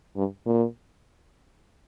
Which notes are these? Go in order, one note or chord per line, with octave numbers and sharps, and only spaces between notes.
G2
A#2